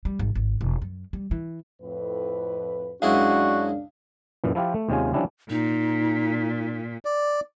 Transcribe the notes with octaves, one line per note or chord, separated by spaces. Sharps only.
G3
G#1
G#1
E1
F#2
G3
E3
F2 A2 B4
F#2 G#3 D4 E4 F#4 F5
F#2 A#2 E3
F3 E4 F4 G4
A3
D#2 C3 G#3 C#4 F4 G#5
F3 G3 C#4 D4 E4 G4
A#2 D#4
D5